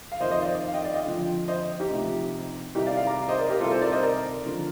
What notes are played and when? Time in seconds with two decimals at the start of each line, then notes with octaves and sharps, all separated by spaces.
0.12 F5
0.20 F2 D#3 C5 D#5
0.31 C5 D#5
0.42 D5 F5
0.68 F5
0.74 D#5 G5
0.84 D5 F5
0.94 D#5 G5
1.06 F2 D3 F3
1.48 C5 D#5
1.80 D#4 G4
1.90 D2 C3 F3
2.75 C2 C3 D#3 D#4 G4
2.86 D5 F5
2.97 D5 F5
3.07 A#5 D6
3.29 C5 D#5
3.39 A#4 D5
3.50 G4 A#4
3.60 C2 C3 D#3 F4 A4
3.71 A4 C5
3.81 A#4 D5
3.92 C5 D#5
4.03 A#4 D5
4.46 D3 F3